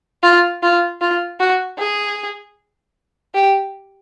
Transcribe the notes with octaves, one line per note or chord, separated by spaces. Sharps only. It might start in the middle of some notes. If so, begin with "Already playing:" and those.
F4
F4
F4
F#4
G#4
G4